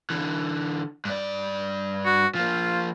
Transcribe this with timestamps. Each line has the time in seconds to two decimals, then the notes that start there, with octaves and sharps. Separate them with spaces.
0.10 D3 E3
1.05 G2 D5
2.06 F#4
2.35 F3 A#3 F4